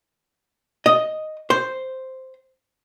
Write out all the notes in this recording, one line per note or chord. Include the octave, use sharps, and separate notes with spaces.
D#5
C5